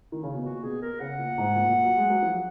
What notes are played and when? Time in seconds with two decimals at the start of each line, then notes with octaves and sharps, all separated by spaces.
0.12 D#3
0.23 C#3
0.34 B2
0.45 A#2 F#4
0.63 B2 G#4
0.82 A#4
1.00 C#3 F#5
1.18 A#2
1.38 G#2
1.55 A#2
1.69 A#2
1.84 F#3
1.97 G#3
2.10 F#3
2.22 F3